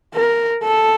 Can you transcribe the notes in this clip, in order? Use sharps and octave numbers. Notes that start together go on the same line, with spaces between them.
A#4
A4